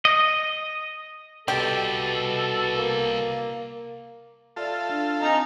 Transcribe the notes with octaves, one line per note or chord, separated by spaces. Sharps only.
D#5
C2 B2 G4 A4
A#3
F4 A4 D5 E5
D4
C4 D#4 G#5 A#5